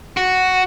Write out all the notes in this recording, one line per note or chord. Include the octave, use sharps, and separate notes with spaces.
F#4